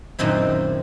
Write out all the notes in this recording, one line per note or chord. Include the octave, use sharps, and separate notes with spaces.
F#2 A#2 D#3 C4 E4